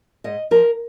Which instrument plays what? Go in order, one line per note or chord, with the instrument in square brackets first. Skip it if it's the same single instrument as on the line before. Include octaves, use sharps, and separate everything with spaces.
[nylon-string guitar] G#2 D#5
F3 A#4